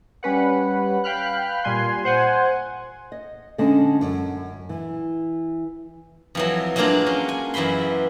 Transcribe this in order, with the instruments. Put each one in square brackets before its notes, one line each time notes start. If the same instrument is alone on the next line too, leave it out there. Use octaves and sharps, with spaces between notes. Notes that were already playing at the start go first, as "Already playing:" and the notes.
[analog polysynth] G3 C#4 B4 F#5
F5 G5 B5 F6 F#6
A#2 G3 G#5 C6
C5 F#5 G#5
[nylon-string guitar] D#5
D3 G#3 C#4 D#5 A5
F#2
E3
[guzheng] F2 E3 F#3
F#3 G#3 A#3 D4 F4
C#4
G#5
F#2 E3 F#4 B5 C6